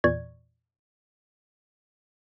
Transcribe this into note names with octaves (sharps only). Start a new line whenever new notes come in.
E2 A#2 E3 D5 C#6 G#6